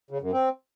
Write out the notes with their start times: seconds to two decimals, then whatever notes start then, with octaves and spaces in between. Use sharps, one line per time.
0.11 C#3
0.22 F#2
0.33 C4